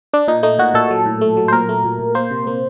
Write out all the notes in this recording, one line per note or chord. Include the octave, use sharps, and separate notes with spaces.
D4
A#2 D#4
A3 D#4
A#2 F#4
A#2 A4
F#3
A2
A3
F#3
C5
A#2 A#4
A3
A#2
A#2
A#3 C5
C3
A#3